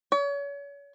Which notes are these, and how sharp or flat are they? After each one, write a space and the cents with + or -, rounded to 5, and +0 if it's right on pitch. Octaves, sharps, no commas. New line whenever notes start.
C#5 +35